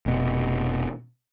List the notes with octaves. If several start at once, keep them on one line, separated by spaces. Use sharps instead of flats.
F1 B2